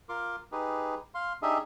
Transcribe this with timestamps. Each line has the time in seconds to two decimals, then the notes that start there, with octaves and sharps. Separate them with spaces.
0.09 F4 A#4 C6 D6
0.52 D#4 G4 G#4 B4
1.15 F5 C6
1.42 D4 D#4 G4 G#4 D#5 E5